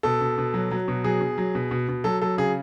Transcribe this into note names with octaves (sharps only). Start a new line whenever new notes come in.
B2 A4
B2
B2
F#3
F#3
B2
F#3 G#4
B2
F#3
B2
B2
B2
F#3 A4
F#3 A4
C#3 G#4